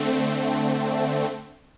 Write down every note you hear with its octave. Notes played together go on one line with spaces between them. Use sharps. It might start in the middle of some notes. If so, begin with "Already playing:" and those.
Already playing: D3 A3 C4